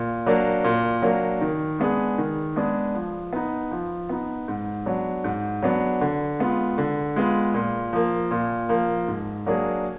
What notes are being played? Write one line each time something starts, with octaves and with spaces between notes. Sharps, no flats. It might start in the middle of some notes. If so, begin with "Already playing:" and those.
Already playing: A#2
F#3 A#3 D4
A#2
F#3 A#3 D4
D#3
G#3 B3 D4 G#4
D#3
G#3 B3 D4 G#4
F3
B3 D#4
F3
B3 D#4
G#2
F#3 B3 D4
G#2
F#3 B3 D4
D3
G#3 B3 F4
D3
G#3 B3 F4
A#2
F3 A#3
A#2
F3 A#3
G#2
F#3 A#3 D4 G#4